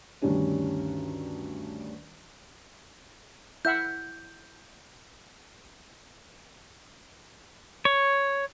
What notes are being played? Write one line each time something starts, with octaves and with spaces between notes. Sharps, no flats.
D2 G2 D#3 G3 C#4 D4
E4 E5 F#5 G6
C#5